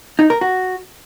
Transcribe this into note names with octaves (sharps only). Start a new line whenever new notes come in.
D#4
A#4
F#4